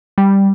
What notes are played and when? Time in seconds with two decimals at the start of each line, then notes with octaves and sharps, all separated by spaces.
0.18 G3